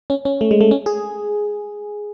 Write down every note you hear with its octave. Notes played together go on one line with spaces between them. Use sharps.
C#4
C#4
A3
G#3
A3
C#4
G#4